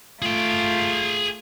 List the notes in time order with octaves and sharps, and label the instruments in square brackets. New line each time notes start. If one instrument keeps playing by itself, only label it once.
[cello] A3 F4 [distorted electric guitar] G#4 G5